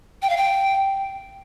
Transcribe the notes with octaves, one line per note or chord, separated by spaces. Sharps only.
G5
F5
G5